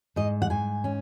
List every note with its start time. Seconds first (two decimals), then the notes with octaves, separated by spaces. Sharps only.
0.16 G#2 D#5
0.42 F#5
0.50 G#2 G#5
0.84 C#4